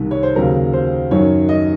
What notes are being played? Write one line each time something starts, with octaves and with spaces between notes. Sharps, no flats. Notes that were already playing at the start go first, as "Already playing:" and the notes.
Already playing: C2 C3 D#3
C#5
C5
D#2 C#3 F#3 A#4
C5
F#2 D#3 F#3 C#5
D#5